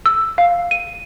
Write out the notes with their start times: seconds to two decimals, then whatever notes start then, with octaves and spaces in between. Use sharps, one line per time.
0.06 E6
0.38 F5
0.71 D#7